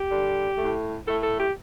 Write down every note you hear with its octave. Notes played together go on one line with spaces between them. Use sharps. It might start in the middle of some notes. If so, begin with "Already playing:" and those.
Already playing: G4
D3 G3
A2 A3
A2 A3 A4
A4
G4